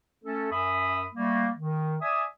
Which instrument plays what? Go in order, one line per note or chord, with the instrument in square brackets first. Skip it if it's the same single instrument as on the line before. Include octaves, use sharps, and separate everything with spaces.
[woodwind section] A3 C#4 A4
F#2 E5 B5 D#6
G3 A3 A#3
D#3
D5 E5 G#5 D#6